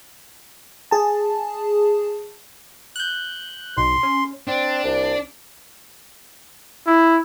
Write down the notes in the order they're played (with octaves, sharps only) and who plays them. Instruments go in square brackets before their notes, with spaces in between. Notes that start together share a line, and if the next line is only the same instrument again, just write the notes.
[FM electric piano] G#4 A5
[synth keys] F#6 G6
[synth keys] B1 [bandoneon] C6
[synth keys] C#4
[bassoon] C4 [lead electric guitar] D4
[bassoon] C2
[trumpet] E4